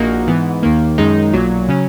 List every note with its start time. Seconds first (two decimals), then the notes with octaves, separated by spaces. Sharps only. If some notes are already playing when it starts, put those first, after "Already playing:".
Already playing: A#1 A#2 A#3 D#4 F#4
0.27 G#2 E3 B3
0.63 D#2 D#3 A#3
0.98 F#2 D#3 G#3 D#4
1.33 B1 A#2 F#3
1.68 C#3 F#3 C#4